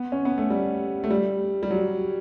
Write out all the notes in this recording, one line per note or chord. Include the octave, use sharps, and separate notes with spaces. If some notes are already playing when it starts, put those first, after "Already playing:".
Already playing: B3
C#4
B3
A3
G3
A3
G3
G3
F#3